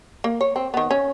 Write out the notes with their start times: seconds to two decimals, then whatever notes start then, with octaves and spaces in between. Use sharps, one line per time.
0.24 A#3
0.41 C#5
0.56 C4
0.74 D#3 B3
0.91 C#4